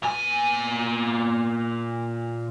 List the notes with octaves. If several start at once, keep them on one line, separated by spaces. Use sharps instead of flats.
A#2 G#5